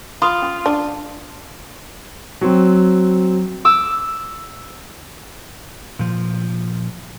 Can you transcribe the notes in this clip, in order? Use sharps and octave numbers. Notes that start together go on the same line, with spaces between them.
F4 B5 C6 D#6
C#4 C6
D4
F#3 C4
D6 E6
A#2 F3